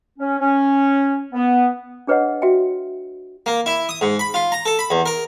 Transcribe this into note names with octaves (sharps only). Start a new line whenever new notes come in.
C#4
C#4
B3
D4 G#4 B4 C#5 D#5 F#5
F#4 E5 G5
A#3
E4
D#6
G#2
B5
F4
A#5
A4
B5
E2
A#4